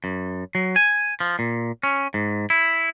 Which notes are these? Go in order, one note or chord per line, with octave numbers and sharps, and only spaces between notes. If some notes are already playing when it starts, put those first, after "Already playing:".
F#2
F#3
G#5
F3
A#2
C#4
G#2
E4